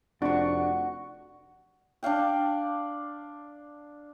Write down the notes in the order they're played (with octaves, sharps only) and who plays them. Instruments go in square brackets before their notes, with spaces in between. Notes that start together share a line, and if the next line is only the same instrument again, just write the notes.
[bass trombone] F1 [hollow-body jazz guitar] D4 [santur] F#4 C#6
[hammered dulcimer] D4 D5 F5 G5